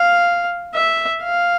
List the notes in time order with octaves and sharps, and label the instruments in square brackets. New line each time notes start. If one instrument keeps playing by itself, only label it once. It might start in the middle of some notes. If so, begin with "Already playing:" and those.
Already playing: [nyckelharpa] F5
E5
F5